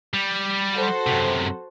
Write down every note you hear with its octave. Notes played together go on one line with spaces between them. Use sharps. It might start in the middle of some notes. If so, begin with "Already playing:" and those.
G3
F#4 A4 C5
F#2 C3